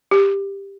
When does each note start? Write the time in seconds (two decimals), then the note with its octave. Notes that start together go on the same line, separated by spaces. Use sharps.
0.11 G4